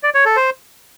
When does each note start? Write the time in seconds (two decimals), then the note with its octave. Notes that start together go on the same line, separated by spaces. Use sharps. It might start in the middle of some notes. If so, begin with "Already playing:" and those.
0.03 D5
0.14 C#5
0.26 A4
0.37 C5